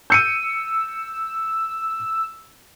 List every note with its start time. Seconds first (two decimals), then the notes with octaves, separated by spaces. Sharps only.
0.10 E6 G6 C#7 D#7